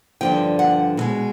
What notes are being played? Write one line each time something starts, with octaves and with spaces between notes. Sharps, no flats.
G2 D3 F3 G5
F#5
B2 G#3